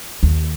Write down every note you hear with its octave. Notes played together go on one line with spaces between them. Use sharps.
D#2